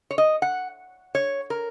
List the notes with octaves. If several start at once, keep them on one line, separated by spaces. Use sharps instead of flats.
C#5
D#5
F#5
C#5
A#4